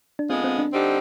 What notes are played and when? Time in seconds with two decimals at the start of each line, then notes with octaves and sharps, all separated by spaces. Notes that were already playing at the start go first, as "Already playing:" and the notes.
0.19 D4
0.29 D3 G#3 B3 C4 F4 G#4
0.44 C4
0.59 D4
0.73 D3 G3 C4 D#4 G4